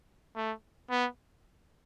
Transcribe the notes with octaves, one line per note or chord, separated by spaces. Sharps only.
A3
B3